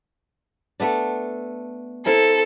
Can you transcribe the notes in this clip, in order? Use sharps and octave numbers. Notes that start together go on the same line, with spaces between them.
A3 B3 D4
C4 E4 A4 A#4